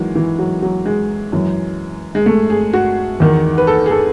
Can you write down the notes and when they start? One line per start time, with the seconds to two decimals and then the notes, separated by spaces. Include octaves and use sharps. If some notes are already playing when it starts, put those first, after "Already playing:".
Already playing: D#3 E3 F#3 G#3
0.16 E3
0.39 F#3
0.62 F#3
0.86 G#3
1.32 F#2 E3
2.15 G#3
2.26 A3
2.50 G#4
2.73 F#4
3.20 E2 D#3
3.58 B4
3.67 A4
3.86 G#4
3.91 A4